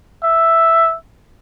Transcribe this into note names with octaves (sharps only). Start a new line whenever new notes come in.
E5